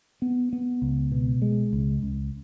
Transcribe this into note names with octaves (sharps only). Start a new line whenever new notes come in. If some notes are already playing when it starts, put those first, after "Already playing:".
B3
B3
C#2
B2
G#3
C#2
C#2